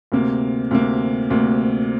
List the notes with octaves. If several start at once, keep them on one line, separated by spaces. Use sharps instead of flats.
D2 C3 A#3
D2 C3 A#3
D2 C3 A#3